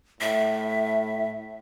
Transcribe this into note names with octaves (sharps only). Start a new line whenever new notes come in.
A2 E5